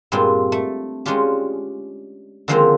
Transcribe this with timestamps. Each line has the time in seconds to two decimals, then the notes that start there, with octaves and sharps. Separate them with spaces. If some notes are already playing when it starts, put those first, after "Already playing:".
0.12 G2 A#2 G#3 C4 F4
0.52 A3
1.06 G#3 C#4 D4 F4 G4
2.48 D3 D#3 F3 G#3 A#3 C4